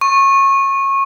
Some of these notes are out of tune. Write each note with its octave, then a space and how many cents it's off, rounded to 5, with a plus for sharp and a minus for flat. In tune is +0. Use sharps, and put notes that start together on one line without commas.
C#6 -25